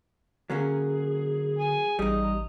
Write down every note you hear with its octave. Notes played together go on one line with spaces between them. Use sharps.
D3 F#3 A#3 C#4 G#4
G#5
A1 G3 D#4 D#5
A#5